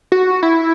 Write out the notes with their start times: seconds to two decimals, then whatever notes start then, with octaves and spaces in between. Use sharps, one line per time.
0.12 F#4
0.43 E4